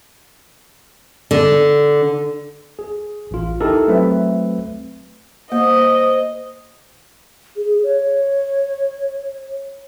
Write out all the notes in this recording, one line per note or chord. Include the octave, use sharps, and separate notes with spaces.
D3
G#4
A1 F4
D#4 E4 G4 A4 A#4
F#3 A3 C4 B4 E5
A#3 C5 D#5
G#4
C#5